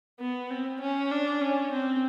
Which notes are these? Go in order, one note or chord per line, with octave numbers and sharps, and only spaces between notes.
B3
C4
C#4
D4
C#4
C4